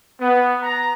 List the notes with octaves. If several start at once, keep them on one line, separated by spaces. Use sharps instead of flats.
B3
A#5